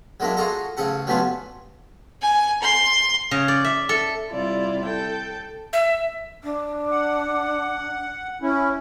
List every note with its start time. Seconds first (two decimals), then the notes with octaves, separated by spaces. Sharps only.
0.20 F#3 G#3 A#3 D4 E4
0.37 F4 F#4 G#4 A4 F5 A#5
0.77 A1 C#3 G#4 A4 F#5
1.07 F#3 G3 A3 B3 C#4 F4
2.22 G#5
2.62 C6
3.31 C#3
3.48 D5
3.64 E5
3.89 A4
4.30 C3 G3 E4 F4 D5
4.84 A4 G5
5.73 E5
6.43 D4
6.91 F#5
8.42 C#4 E4